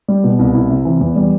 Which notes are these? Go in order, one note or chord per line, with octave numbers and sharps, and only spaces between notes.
G3
B2
C2
E4
C3
E3
E2
G3